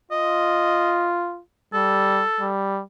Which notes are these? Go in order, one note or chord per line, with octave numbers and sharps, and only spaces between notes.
F4 D#5
G3 A4
G3